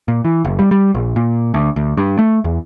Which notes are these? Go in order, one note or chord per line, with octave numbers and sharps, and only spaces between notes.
A#2
E3
F#1
G3
G3
A#1
A#2
D2
D2
G2
A3
E2